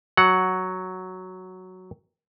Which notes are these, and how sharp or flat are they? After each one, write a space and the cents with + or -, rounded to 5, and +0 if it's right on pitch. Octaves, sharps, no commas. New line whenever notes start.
F#3 +0 F#5 +0